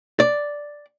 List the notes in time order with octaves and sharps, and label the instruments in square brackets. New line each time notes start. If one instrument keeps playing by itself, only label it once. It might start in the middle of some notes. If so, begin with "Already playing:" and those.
[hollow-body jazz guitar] D5